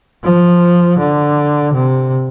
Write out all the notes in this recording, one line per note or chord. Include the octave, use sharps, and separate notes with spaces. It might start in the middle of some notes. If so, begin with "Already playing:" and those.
F3
D3
C3